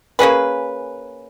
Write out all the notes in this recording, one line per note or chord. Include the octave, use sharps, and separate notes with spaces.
A#3 C#4 G#4 B4